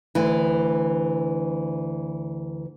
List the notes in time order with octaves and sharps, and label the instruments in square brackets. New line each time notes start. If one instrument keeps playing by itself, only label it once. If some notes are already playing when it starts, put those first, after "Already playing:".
[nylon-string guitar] D2 E3